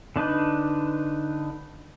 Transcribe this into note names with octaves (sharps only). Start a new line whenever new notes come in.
D3 D4 D#4 B4